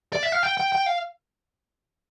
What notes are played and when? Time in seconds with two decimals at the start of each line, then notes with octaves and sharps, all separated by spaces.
0.13 D5
0.23 E5
0.32 F5
0.43 G5
0.57 G5
0.72 G5
0.86 F5